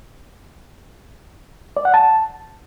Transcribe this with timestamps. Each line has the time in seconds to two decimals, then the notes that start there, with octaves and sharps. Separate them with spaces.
1.77 D5
1.85 F#5
1.94 A5